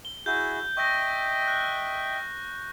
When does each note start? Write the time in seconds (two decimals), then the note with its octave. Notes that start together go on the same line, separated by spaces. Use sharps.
0.05 G7
0.26 E4 F#4 G#4 G6
0.77 D#5 E5 G5 C#6 A#6
1.48 F#6